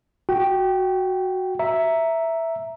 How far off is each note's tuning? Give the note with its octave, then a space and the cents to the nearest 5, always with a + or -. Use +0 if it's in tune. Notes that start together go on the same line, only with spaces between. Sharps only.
F#4 +0 G5 +0
E5 +0 A#5 +0